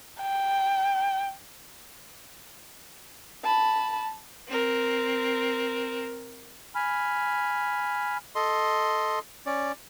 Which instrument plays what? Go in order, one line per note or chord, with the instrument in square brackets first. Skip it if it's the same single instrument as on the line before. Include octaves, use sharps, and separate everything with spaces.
[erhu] G5
[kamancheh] A5 B5
[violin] C4 A#4
[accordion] G#5 B5 F6
[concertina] A4 D#5 C6
C#4 D5